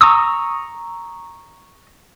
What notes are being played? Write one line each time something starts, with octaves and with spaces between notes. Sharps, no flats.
A#5 C#6 D#6 E6